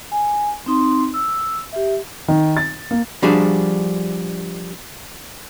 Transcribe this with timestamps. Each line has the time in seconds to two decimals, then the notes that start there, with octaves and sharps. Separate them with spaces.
0.12 G#5
0.66 C4 D#4 C6
1.14 E6
1.72 G4 E5
2.28 D#3
2.57 A6
2.91 A#3
3.22 F3 G3 D4 F#4 G#4